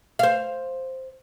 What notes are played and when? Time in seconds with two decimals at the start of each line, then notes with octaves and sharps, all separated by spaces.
0.19 C5 F5